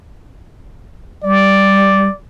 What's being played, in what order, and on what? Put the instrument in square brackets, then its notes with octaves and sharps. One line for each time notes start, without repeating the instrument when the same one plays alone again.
[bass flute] G3 [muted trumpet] D5